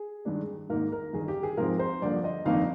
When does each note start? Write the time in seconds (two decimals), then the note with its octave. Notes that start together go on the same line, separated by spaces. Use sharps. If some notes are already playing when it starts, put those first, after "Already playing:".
Already playing: G#4
0.25 G2 D#3 G#3 D4
0.70 G#2 D#3 A#3 D#4 A#4
0.92 A#4
1.13 G1 G2 D#3 G#4
1.28 G4
1.43 G#4
1.57 G#2 F3 G#3 C4 A#4
1.79 C5
2.02 G2 D3 F3 A#3 D5
2.24 D#5
2.45 G1 F2 D#3 A#3 D#4 F5